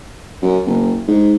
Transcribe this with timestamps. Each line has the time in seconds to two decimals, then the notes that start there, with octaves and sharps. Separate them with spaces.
0.42 F#2
0.66 F#1
1.08 G#2